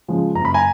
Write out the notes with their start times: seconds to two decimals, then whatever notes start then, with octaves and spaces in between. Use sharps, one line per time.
0.08 C#3 F3 G#3
0.34 F#1 A#5
0.45 B5
0.54 G#5 A#5